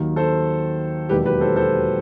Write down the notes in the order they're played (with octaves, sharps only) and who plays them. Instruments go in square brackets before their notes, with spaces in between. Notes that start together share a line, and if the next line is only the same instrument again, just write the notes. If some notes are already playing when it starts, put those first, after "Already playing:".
Already playing: [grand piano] D#2 D#3 F#3
A4 C5
E1 D#2 D#3 F#3 G4 B4
G4 B4
A4 C5
A4 C5